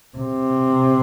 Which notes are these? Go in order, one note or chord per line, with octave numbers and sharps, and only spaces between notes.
C3